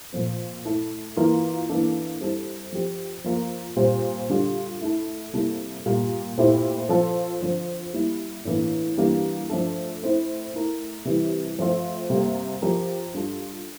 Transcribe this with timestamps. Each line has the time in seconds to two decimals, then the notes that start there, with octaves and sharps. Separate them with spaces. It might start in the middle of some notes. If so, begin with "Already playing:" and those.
0.12 A#2 F3 C4
0.65 A3 E4 A4
1.17 E3 A#3 F4 A#4
1.69 E3 A#3 D4 A4
2.21 G3 C4 E4 A4
2.72 F3 C4 G4
3.24 F3 A#3 F4 A#4
3.76 A#2 G3 C4
4.29 D3 G3 D4 F4
4.81 A3 E4 A4
5.33 C3 G3 A#3 E4 A4
5.86 A#2 G3 A#3
6.37 A#2 A3 C4 E4 G4
6.89 F3 C4 F4 A4
7.41 D3 F3 C4 F4
7.93 G3 A#3 E4
8.45 A2 E3 A#3 D4
8.97 E3 G3 A#3 D4
9.49 F3 A3 D4 A4
10.02 A3 C4 E4
10.54 A3 E4 A#4
11.05 C3 E3 G3
11.59 F3 A3 C4 F4
12.10 C3 G3 A#3
12.62 F3 C4 G4 A#4
13.14 G3 D4 F4 A4